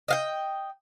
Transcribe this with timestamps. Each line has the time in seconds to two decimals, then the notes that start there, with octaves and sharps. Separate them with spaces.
0.08 D#5 F5 G5